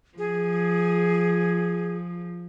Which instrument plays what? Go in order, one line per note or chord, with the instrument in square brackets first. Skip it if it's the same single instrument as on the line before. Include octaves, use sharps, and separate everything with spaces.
[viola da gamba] F3 [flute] G#4